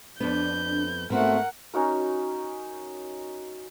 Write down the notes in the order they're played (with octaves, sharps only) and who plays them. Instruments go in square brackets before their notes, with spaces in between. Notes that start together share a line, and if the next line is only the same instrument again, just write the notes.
[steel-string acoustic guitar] F2 G#2 B3 [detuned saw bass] D4 [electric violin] G6
[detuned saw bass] G#2 [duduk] A3 [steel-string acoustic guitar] B3 C4 F#4 [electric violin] A#4 F#5
[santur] C#4 D#4 F#4 A#4